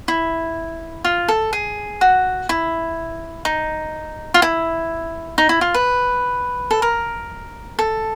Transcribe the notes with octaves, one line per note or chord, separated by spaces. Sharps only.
E4
F4
A4
G#4
F#4
E4
D#4
F4
E4
D#4
E4
F4
B4
A4
A#4
A4